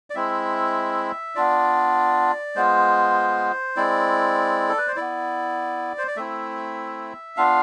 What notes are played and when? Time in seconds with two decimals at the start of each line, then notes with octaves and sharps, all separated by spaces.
0.10 D5
0.15 G#3 C4 E4 E5
1.35 B3 D4 F4 D5
2.55 G#3 B3 F4 C5
3.76 G#3 C4 E4 D5
4.69 A4
4.78 B4
4.87 C5
4.96 B3 E4 D5
5.98 C5
6.07 D5
6.16 A3 C4 E4 E5
7.37 B3 D4 F4 F5